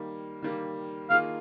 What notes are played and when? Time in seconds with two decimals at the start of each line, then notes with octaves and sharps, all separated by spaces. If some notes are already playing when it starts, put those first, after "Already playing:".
Already playing: D#3 G3 A#3
0.42 D#3 G3 A#3
1.10 D#3 A#3 F4 G#4 F5